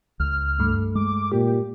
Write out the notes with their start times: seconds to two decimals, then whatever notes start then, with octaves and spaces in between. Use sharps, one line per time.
0.20 C#2 F6
0.60 G2 A3
0.95 G#3 D6
1.32 A#2 G4